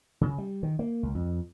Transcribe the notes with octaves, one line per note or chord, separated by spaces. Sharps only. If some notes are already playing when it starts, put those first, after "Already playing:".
C#3
G3
D#3
A#3
C#2
F2